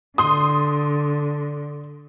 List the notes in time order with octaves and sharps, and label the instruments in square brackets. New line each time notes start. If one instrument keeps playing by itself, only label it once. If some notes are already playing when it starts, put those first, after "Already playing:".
[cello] D3 [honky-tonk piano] C6 D#6